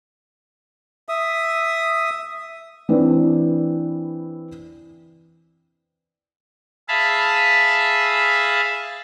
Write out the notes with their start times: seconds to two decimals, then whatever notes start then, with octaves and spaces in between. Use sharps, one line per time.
1.09 E5 D#6
2.89 E3 C4 D4 B4 D5
6.88 G#4 E5 F5 A5 B5